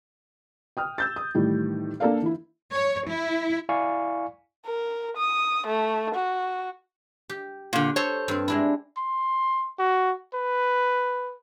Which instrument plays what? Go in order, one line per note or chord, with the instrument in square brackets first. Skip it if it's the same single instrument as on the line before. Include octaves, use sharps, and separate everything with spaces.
[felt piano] G5 D#6 F6
E6 G6 A6
D#6
A2 D#3 E3 G3
A#3 D4 A4 D5 F5
E3 E4
[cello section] C#5
E4
[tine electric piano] E4 D5 F5 G#5 C#6
[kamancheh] A#4
D#6
A3
F#4
[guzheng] G4
[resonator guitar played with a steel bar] A#2 D3
[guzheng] A4 [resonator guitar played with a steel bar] C5 C#5
[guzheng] G2 C4
G#3 D4 E4
[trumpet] C6
F#4
B4